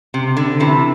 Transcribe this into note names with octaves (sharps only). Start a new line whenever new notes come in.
C3
D3
C3 E3